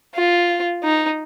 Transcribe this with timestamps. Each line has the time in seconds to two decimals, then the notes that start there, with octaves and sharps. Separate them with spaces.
0.15 F4
0.84 D#4